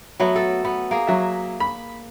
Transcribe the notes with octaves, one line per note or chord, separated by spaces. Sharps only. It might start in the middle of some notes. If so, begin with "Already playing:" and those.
F#3 A3 B3
A4
B3
A#3 G#4
F#3 E5
B5